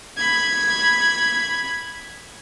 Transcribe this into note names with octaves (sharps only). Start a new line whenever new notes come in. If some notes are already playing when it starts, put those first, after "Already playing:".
B5 G#6